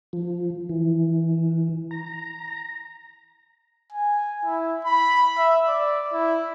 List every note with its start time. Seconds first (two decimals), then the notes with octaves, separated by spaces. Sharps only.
0.13 F3
0.69 E3
1.91 A#5
3.92 G#5
4.45 E4
4.85 B5
5.38 E5
5.68 D5
6.13 E4